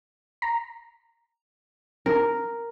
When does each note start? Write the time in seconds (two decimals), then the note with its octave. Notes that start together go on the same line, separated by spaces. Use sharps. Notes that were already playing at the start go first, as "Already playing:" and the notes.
0.42 A#5
2.06 C4 D4 A#4